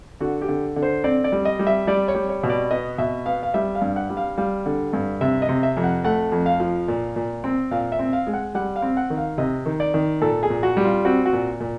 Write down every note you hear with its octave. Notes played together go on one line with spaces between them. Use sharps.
D3 F#4
G4
D3
D3
C5
C4 D5
D5
G3
D#5
G3
E5
G3 D5
C#5
G3
C#5
B2
D5
B3 D#5
B2 E5
B3 F5
F5
G3 E5
F5
G2
F#5
G3
F5
G3 F5
D3
G2
C3 E5
D#5
C3
E5
F2
F#5
A3 F#5
F2
F5
F3
A#2
A#2
C4
A#2 F5
E5
C4
F5
G#3
F#5
G3 F#5
F5
C4
F#5
D#3
F5
C3 D#5
D#3
D5
D#3
A#2 A4
G#4
A#2
F#4
G3
F4
C4 F#4
F#4
A#2
A#2